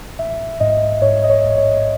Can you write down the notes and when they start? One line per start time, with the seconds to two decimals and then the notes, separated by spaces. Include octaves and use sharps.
0.19 A1 E5
0.60 G#2 D#5
1.02 G#2 C#5
1.24 D#5
1.29 C#5
1.44 A1
1.57 C#5